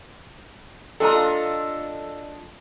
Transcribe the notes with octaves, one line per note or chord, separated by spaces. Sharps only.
D4 F4 A4 D#5 A#5